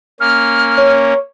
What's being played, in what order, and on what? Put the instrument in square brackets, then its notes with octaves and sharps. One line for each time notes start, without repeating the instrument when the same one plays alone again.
[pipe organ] A#3 C#4 [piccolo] F6
[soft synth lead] C#5